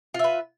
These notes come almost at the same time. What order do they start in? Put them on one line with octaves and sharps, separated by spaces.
F4 E5 B4